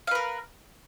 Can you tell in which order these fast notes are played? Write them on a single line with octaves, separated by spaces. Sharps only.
F5 B4 A#4